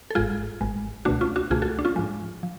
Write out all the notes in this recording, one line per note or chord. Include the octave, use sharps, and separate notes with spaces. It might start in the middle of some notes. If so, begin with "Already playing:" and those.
A4
G#1 G#2 G#3 F4 G#4
G#1 G#2 G#3
C#2 B2 A3 D4 F#4
C#4 F4
D4 F#4
C#2 B2 A3 F4 G#4
F#4 A4
D4
C#4 F4
G#2 F3 G#3
F3